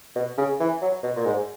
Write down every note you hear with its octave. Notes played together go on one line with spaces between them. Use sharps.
B2
C#3
E3
F#3
B2
A#2
G#2